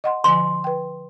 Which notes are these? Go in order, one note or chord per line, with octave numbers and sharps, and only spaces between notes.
D#5 F#5 C6
D3 F3 G#5 C6
B4 G5